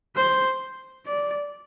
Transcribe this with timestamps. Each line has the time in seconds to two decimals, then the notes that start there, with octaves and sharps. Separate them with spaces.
0.16 C5
1.06 D5